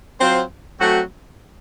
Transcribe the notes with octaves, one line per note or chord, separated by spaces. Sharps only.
F#3 C4 F4 C5
F#3 A3 C4 F#4